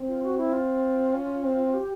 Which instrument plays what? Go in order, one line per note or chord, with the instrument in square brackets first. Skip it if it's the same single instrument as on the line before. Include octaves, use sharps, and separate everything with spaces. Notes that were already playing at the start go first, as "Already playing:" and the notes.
Already playing: [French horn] C4
[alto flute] F4
F#4
E4
F4
[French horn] C#4
C4
[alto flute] G4